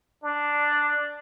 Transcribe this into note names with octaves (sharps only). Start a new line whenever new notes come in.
D4